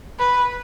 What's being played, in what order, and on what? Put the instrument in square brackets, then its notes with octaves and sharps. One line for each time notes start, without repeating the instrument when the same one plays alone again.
[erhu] B4